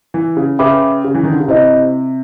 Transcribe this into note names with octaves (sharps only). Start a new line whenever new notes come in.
E3
C#3
C#3 B4 E5 G5 B5 D6
C#3
E3
D#3
D3
C#3
C3 E4 G4 C5 D#5